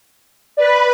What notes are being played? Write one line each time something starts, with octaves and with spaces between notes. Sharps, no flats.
B4 D5 B5